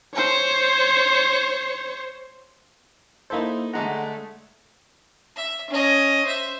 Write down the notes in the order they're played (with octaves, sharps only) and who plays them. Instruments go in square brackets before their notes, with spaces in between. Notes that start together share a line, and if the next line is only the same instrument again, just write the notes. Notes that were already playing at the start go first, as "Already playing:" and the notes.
[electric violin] C5 C#5
[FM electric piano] A#3 C5 [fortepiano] D#4 E4 A4
[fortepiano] D3 G#3 A#5 [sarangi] A3 [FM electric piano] F#5
[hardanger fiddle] E5
C#4 D#5
C5 E5